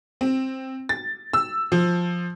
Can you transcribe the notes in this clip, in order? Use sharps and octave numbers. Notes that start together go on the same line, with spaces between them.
C4
A6
E6
F3